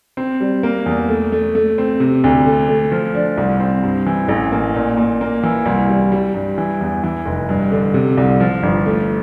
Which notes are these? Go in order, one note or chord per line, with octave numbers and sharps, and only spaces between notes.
C4
G3
A#3
E2
A3
A3
A3
C4
C3
D2
A3
A3
F3
D4
C2
C4
G2
E3
A1
A#3
A#2
A#2
A#3
E3
C2
G3
G3
G2
E3
E2
E3
F1
G2
D3
C3
C2
F3
G1
A3